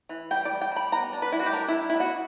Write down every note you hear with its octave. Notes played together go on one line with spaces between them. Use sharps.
E3
G3 G5
D5
G3
G5
G3
B5
B3 A#5
D4
B4
G3 E4
F#4
G4
D4 A#4
E4
G3
B3 E4
F#4